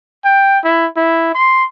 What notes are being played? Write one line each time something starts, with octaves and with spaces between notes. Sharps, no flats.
G5
E4
E4
C6